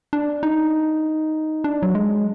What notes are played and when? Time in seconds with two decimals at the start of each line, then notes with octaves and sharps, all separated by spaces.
0.13 D4
0.43 D#4
1.64 D4
1.83 F#3
1.95 G#3